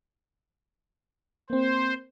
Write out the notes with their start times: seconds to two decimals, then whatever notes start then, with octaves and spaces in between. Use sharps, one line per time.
1.50 A#3 C4 C5